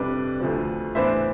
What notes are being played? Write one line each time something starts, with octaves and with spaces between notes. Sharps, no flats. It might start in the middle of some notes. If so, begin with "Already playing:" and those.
Already playing: F2 C3 G3 D4 B4
D2 D3 F3
A2 E3 B3 D4 C5 E5